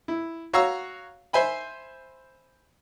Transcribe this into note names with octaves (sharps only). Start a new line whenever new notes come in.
E4
F#4 C#5 F5 A#5 C#6 E6
C5 E5 G#5 B5